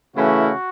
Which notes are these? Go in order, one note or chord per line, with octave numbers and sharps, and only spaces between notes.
C#3 E3 A3 C#4 E4 F#4